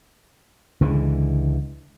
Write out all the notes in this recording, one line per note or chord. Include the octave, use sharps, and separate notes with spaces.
C#2 D3 E3 G#3